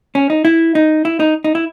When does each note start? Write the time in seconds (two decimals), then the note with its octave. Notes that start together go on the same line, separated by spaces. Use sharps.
0.15 C#4
0.30 D#4
0.45 E4
0.75 D#4
1.05 E4
1.20 D#4
1.44 D#4
1.55 E4